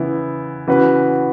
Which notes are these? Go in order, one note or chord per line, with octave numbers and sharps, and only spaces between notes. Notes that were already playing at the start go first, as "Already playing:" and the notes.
Already playing: C#3 E3 B3 E4
C#3 E3 B3 F#4 B4